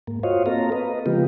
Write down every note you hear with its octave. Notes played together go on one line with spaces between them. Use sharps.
G#2 A#3
F4 F#4 C5 C#5 D#5 F5
A#3 C4 A4 F5 A#5
B4 D#5
C#3 F3 G#3 B3 F4 G4